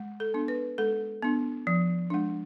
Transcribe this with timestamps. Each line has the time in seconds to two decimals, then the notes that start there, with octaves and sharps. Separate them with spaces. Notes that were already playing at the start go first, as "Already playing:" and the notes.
Already playing: G#3
0.20 A4
0.34 B3 D4
0.48 B4
0.78 G#3 A4
1.23 B3 D4
1.67 F3
2.10 G#3 D4